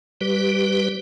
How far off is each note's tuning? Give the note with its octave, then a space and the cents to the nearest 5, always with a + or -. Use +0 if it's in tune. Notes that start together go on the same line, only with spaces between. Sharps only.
G3 +0 G4 -20 B4 +0